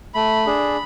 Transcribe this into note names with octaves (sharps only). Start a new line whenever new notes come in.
A3 B5
D4 G#4